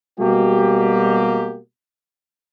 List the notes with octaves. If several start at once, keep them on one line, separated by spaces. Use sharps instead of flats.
B2 G3 G#3 A#3 F#4 G4